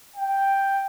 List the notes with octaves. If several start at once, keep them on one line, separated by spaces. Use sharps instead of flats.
G5